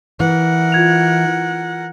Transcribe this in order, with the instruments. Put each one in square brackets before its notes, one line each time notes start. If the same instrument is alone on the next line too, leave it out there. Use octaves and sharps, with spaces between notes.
[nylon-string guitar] E3 [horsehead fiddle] A#4 F#5
[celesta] F4 G#6 F7